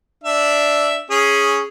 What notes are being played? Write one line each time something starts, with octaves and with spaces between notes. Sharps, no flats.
D4 E5
C#4 G#4